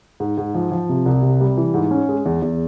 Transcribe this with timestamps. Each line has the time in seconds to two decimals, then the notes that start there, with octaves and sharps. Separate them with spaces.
0.20 G#2
0.38 G#2
0.55 F3
0.72 F3
0.89 C3
1.06 C2
1.22 C3
1.41 G3
1.57 E3
1.74 G#2
1.91 C#4
2.09 G#3
2.25 E2
2.42 E2